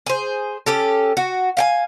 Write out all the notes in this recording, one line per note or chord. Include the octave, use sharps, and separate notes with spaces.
G#4 C5
C#4 G4 A4
F#4
F5 G5 G#5